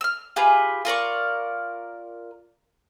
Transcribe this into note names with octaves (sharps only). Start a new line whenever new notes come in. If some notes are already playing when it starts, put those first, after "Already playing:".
E6 F6
F4 G4 G#4 B4
F4 A#4 D5 C#6